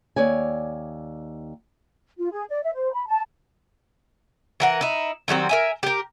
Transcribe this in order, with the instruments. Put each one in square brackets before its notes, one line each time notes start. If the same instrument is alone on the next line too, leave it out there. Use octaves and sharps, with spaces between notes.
[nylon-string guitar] D#2 C#5 D5 G#5
[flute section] F4
G#4
D5
E5
C5
B5
A5
[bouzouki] E3 A#4 F#5
D#4 E4
D#3 F#3 G3 C4
A#4 E5 G#5
G4 A#4